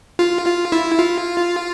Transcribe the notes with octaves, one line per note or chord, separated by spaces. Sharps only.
F4
F4
E4
F4